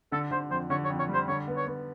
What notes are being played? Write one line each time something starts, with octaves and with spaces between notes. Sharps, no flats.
D3 A4
D3 C5
F2 C5
D3 C#5
C#5
F2
C#5
G3 C5
D3 C#5
B3
C#5
B3